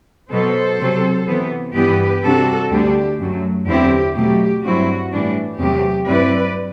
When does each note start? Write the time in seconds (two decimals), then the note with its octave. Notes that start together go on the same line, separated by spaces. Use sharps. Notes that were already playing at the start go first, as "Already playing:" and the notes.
0.31 B2 F#3 B3 A4 C5
0.79 C3 F#3 C4
1.26 C3 E3 B3
1.74 G2 E3 B3 G4 B4
2.23 C3 G3 D4 F#4 A4
2.70 D2 D3 G3 D4 G4
3.19 F#2 F#3 A3
3.66 E2 D3 F#3 C4 E4 G4
4.15 B2 F#3 A3 G4
4.63 G2 F#3 C4 E4 F#4
5.11 A2 E3 G3 D4
5.58 E2 C3 F#3 A3 G4
6.06 G2 F#3 C4 E4 B4 D5